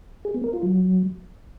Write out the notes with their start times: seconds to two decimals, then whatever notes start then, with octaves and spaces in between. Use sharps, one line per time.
0.25 G#4
0.34 B3
0.44 A#4
0.53 F4
0.63 F#3